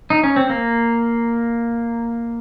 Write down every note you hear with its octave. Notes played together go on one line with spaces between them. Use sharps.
D#4
C#4
C4
A#3